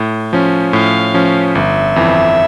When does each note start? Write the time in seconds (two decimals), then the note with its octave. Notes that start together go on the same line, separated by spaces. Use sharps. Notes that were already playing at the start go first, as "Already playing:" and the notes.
Already playing: A2
0.33 F3 C#4
0.73 A2 F5
1.14 F3 C#4
1.55 G1 E5
1.96 F2 E3